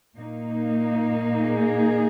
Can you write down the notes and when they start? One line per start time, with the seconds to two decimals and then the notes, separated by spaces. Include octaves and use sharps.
0.17 A#2 A#3 D#4
1.40 G#4